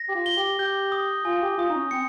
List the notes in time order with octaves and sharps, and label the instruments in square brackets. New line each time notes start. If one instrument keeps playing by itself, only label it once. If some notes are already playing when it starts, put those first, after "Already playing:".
Already playing: [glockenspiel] A#6
[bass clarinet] G4
F4
[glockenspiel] G7
[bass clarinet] G4
[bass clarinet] G4 [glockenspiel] G6
[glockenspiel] D#6
[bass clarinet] F4 [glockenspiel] G#5
[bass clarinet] G4
[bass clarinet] F4 [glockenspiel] D#6
[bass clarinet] D#4
C#4
[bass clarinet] C4 [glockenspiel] C#7